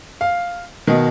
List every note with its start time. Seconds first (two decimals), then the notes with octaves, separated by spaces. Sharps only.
0.21 F5
0.87 B2 D#3